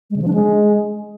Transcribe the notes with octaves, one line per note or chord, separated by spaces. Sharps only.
G#3
C#3
F3
D4
G#3